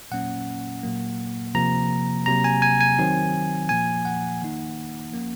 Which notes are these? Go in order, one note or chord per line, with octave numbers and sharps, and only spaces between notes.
A#2 F#3 A#3 C#4 F#5
A#2 F#3 A#3
C3 F3 A#3 A#5
C3 F#3 A#3 A#5
G#5
G#5
G#5
D#3 F#3 C4 D#4
A#2 F3 A#3 G#5
F#5
D#3 A#3 D#4
F3 A#3 C#4